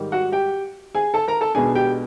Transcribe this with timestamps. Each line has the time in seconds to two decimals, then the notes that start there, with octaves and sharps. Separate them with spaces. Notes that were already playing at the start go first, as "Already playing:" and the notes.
Already playing: G#2 D#3 G3
0.12 F#4 F#5
0.32 G4 G5
0.95 G#4 G#5
1.14 A4 A5
1.28 A#4 A#5
1.41 A4 A5
1.55 B1 B2 G#3 B3 D4 G#4 G#5
1.75 G4 G5